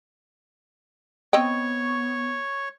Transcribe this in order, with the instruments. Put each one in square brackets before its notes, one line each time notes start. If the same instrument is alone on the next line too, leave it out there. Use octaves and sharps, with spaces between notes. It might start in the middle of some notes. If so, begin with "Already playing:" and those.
[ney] B3 [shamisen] C4 D#5 G5 [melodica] C#5 C#6